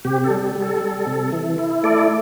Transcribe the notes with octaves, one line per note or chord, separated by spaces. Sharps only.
C3 G4
A4
G3
G3
A4
G3
C3
E3
E4
A3 A4 D5